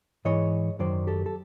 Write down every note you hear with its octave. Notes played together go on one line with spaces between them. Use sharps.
G#2 E3 C#5 D#5
F#2 D#3 F#3 C5 D5
G4 A4
A4